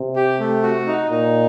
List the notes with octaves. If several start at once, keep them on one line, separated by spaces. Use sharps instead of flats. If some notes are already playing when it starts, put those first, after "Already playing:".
Already playing: C3
G4
A3
F#4
D#4
A#2 D#4